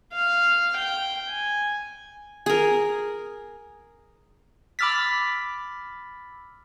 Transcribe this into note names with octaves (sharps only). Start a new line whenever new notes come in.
F5
G5
G#5
G#4 A#4
B5 D6 E6 F6 A6 B6